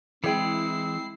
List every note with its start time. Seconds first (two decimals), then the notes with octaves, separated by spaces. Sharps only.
0.24 E3 G#3 C4 E4 G#4 G5 C7